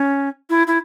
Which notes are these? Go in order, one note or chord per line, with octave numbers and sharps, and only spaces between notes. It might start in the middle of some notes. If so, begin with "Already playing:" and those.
Already playing: C#4
E4
E4